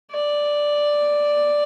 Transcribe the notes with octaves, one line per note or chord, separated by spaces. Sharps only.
D5